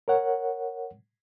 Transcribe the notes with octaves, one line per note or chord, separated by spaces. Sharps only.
A#4 C#5 F#5